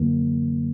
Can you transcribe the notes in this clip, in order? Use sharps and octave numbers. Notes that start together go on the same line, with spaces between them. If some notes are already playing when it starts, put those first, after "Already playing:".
Already playing: F#2 D3 F#3 A#3